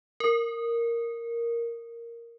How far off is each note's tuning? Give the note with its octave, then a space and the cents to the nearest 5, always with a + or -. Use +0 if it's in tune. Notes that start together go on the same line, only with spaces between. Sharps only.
A#4 -5